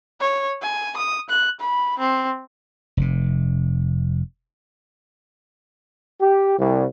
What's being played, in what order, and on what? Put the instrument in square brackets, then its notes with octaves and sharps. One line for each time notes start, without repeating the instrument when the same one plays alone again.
[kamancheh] C#5
G#5
D#6
F#6
B5
C4
[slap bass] F1 C3
[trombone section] G4
C2